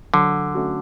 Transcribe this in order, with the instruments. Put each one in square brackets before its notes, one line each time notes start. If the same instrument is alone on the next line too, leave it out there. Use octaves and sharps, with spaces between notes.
[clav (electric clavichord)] D3 [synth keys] F#3
[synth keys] A3 C#4 F#4